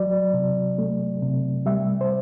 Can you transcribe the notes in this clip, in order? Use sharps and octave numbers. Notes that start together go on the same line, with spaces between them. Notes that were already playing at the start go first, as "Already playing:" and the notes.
Already playing: F#3 D5
C3
A3
C3
G3 E5
C5